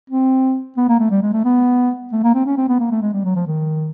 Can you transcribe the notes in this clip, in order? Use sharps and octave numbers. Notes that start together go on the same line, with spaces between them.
C4
B3
A#3
A3
G3
G#3
A3
B3
A3
A#3
C4
C#4
C4
B3
A#3
A3
G#3
G3
F#3
F3
D#3